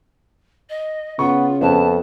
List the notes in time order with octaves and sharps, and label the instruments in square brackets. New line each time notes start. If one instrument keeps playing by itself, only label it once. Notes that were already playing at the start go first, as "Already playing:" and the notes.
[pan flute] D#5
[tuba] C#3 [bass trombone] B3 [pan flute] F4 [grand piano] C#6
[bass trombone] F2 [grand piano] B3 [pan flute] A5